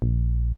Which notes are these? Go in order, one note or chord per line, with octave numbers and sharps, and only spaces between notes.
A#1